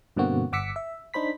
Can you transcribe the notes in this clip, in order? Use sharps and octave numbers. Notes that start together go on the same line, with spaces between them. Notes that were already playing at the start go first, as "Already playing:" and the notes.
G2 B2 D3 A#3 C4 F#4
G1 F#5 D6 E6 B6 C#7
E5
D4 D#4 C5 B5 B6